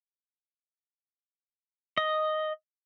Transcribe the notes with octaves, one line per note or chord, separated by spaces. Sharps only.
D#5